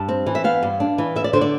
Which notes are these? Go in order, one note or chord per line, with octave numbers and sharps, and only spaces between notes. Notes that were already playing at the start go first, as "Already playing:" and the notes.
Already playing: G2 A5
C4
E3
E5
B3 F5
G2
D4
E3
B3 E5
D5
D3 C5
D5